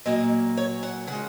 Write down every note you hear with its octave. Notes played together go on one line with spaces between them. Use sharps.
A#2 F#3 A#3 D#5
C#5
F#5
C#3 G#3 F#5